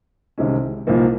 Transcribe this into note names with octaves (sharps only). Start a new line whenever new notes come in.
C2 C3 D#3 G#3 C#4
C2 A#2 F3 A#3 D#4